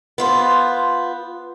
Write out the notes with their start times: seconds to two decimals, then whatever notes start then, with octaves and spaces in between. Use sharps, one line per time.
0.18 B3 F4 C5